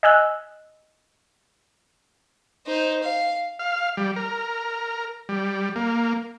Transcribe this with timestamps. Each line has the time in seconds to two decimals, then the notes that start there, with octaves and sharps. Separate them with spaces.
0.03 D#5 G#5 E6 F#6
2.66 D#4 C5
3.03 F5
3.59 F5
3.97 G3
4.16 A#4
5.29 G3
5.76 A#3